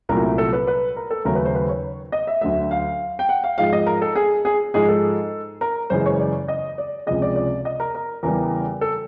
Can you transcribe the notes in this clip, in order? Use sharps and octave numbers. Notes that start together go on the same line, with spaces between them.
C2 A#2 F#3 A3 A#4
A4
B4
B4
A#4
A4
D#2 C#3 F#3 A3 A#4
B4
C5
B4
C#5
D#5
E5
D2 D3 F#3 A3 E5
F5
G5
F#5
F5
G#2 F3 G#3 F5
D#5
A#4
A4
G#4
G#4
G#2 F3 G#3 G#4
A4
A#4
F#2 C#3 E3 G#3 C5
C#5
D5
D#5
D5
C#2 C3 F3 G#3 D#5
D5
D5
D#5
A#4
A#4
E2 C#3 E3 G3 A#4
A4